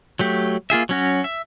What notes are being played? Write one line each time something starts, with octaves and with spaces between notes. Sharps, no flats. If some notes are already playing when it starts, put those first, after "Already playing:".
F#3 A3 G4
A#3 F4 G#4 E5
F#3 C#4 F#4
E5